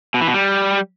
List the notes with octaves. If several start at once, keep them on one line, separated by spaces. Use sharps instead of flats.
B2
E3
B2
G3